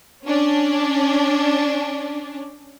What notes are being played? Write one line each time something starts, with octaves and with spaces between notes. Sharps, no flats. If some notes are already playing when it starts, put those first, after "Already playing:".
C#4 D4